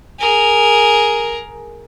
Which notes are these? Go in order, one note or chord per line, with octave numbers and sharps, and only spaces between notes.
G#4 A#4